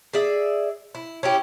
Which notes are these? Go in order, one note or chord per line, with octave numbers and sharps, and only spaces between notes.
G#4 D5 E5
E4
C#4 E4 G4